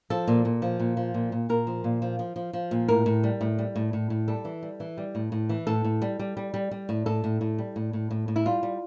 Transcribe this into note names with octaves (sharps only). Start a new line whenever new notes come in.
F3 A4
A#2
A#2
F3
A#2
F3
A#2
A#2
A#2 A#4
F3
A#2
F3
F3
F3
F3
A#2
A2 A#4
A2
G3
A2
G3
A2
A2
A2
G3 A4
E3
G3
E3
G3
A2
A2
E3
A2 A4
A2
G3
G3
G3
G3
G3
A2
A2 A4
A2
A2
G3
A2
A2
A2
A2
E4
G3 F4
G3